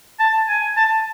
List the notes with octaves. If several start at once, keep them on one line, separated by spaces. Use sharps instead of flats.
A5
G#5
A5